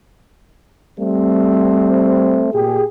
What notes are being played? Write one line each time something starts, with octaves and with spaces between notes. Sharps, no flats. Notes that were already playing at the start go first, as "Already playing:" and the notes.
G3 A3 C4
A#2 G4 G#4